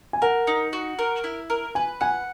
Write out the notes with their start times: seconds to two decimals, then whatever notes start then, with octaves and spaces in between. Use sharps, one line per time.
0.13 G#5
0.22 A#4 F#5
0.47 D#4
0.73 F#4
0.99 A#4
1.24 E4
1.50 A#4
1.75 B4 G#5
2.01 F#5 G#5